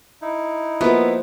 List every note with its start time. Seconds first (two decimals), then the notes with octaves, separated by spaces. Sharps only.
0.22 D#4 E4
0.81 F3 A#3 B3 F#4 E5